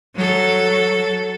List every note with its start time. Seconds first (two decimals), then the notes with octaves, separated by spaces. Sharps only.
0.15 F#3 A4